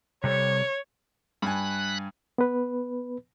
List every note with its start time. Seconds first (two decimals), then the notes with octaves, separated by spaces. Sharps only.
0.24 C3 G3 A4 C#5
1.42 G2 G#5 B5 F#6
2.38 B3 B4